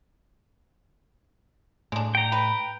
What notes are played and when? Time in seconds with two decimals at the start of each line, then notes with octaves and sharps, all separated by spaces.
1.92 A2 G#3 D4
2.15 G5 A#5
2.32 B4